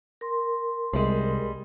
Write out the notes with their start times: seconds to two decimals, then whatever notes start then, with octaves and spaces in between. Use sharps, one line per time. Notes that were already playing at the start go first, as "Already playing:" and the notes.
0.21 A#4 C6
0.93 C2 G3 G#3